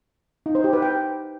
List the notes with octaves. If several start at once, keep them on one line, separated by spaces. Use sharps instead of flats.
D#4
C5
G4
B4
G5